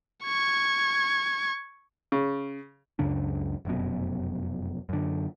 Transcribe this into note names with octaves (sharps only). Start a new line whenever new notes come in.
C#6 G#6
C#3
C#2 F#2 C#3 D4
F1 F#2 B2
F#2 D3